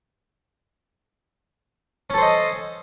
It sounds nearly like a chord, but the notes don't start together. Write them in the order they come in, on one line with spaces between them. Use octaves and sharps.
C#4 A4 C5 D#5